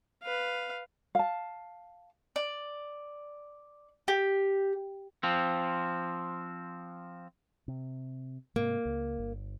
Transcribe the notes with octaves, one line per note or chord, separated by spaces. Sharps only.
B4 F5
F5 A5
D5
G4
F3 C4
C3
G#2 C3 A#3
C#2
G1